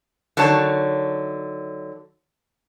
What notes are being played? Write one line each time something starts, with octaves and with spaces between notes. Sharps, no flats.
D3 D#3 F#3 C#5 A5